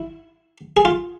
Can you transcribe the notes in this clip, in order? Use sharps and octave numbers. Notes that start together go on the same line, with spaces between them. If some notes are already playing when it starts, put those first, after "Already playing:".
Already playing: E4
G#4
F4